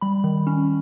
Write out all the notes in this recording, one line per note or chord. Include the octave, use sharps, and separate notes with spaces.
G3 B5
D#3
C#4